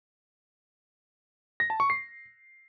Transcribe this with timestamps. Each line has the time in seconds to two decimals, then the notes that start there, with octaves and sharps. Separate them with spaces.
1.60 A#6
1.70 A5
1.80 C#6
1.90 C7